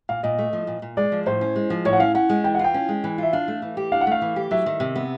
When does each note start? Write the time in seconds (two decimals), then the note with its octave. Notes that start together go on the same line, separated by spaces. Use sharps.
0.09 A#2 F5
0.23 A#2 D#5
0.38 A3
0.53 F3
0.67 A#2
0.82 A#2
0.97 G#3 D5
1.12 F3
1.26 A2 C5
1.41 C#4
1.56 G#3
1.70 F3
1.85 A2 C#5
1.93 F#5
2.00 C#4 F5
2.15 C#4 F#5
2.29 G#3
2.44 E3 G5
2.54 F#5
2.59 F4
2.64 G5
2.74 C#4
2.89 G#3
3.04 E3
3.18 F4 E5
3.33 D4 F5
3.48 A3
3.62 E3
3.77 G4
3.92 D4 F5
4.01 F#5
4.07 A3 F5
4.22 E3
4.36 G4
4.51 F#3 E5
4.66 D#3
4.80 C3
4.95 B3